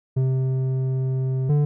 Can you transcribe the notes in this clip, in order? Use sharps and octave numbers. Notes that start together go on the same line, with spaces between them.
C3
D3